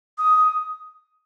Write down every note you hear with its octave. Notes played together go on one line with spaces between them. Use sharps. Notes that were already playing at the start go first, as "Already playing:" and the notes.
D#6